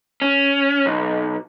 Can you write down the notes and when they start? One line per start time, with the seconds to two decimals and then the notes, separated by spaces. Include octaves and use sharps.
0.22 C#4
0.86 B1